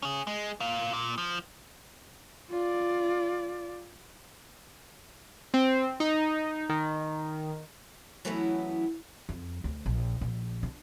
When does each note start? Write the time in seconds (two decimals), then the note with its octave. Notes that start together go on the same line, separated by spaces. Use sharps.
0.02 C#4 G#4
0.27 G#3
0.60 A#2 F5
0.94 A#2
1.18 F3
2.50 F4 D5
5.54 C4
6.00 D#4
6.69 D#3
8.25 E3 F#3 A3 B3 C#4 E4
9.29 F2
9.64 D2
9.86 A#1
10.21 A#1
10.63 D4